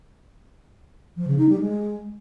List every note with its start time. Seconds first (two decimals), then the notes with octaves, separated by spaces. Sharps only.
1.16 F3
1.27 C#3
1.38 D#4
1.49 G3
1.60 G#3